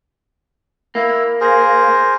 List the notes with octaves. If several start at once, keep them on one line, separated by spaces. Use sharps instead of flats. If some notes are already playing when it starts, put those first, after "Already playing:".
A#3 E4
G#4 A#4 C5